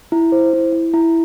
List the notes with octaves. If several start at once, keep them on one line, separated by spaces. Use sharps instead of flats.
E4
C5
E4
E4
E4